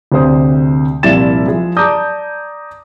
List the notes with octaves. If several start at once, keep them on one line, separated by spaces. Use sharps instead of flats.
D2 C3 C5 D#6
C2 A#2 F3 E4 A6 E7
F3 G#3 G#4
D5 A5 A#5 D6 D#6 G6